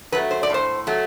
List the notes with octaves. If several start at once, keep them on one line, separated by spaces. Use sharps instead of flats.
F#3 A3 B4
C5
D5
A2 C5
F#3 A3